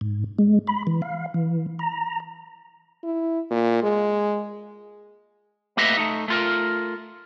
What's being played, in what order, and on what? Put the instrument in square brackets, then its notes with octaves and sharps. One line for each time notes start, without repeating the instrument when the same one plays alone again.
[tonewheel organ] G#2
G#3
B5
E3
F5
E3
A#5
[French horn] E4
A#2
G#3
[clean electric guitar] A3 A#3 G4 B4 D#5 E5
A3 D#4
A3 F4 A#4